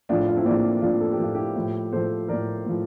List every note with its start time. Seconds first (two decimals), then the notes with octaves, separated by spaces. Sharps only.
0.09 A2 F3 D4 F4
0.28 D4 F4
0.37 C4 E4
0.45 A2 F3 A#3 D4
0.82 A2 F3 D4 F4
1.01 A4
1.13 G4
1.19 A2 F3 F4
1.34 E4 G4
1.56 A2 F3
1.92 A2 F3 A4 C5
2.28 A2 F3 A#4 D5
2.65 A2 F3